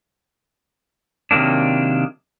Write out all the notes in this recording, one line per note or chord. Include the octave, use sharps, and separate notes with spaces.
C3 D#3 F#3 A#3 D4